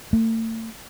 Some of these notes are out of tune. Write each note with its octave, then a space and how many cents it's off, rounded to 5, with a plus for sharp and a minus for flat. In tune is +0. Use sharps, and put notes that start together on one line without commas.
A3 +40